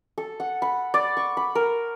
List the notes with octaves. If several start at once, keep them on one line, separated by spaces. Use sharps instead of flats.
A4
F#5
B5
D5
C#6
B5
A#4